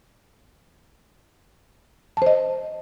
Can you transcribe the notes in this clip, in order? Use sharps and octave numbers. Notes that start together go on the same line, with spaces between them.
C5 D#5 A5